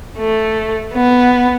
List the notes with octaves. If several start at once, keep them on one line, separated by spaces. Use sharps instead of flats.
A3
B3